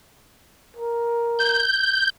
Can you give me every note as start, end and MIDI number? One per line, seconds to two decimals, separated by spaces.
0.77 1.63 70
1.39 2.10 91